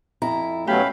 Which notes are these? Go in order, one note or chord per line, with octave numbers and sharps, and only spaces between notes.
F2 E4 A#5
B2 F#3 A3 C#4 G4 E5 F5 B5